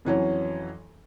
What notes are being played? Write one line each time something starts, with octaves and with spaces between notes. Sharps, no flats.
F2 E3 F#3 C#4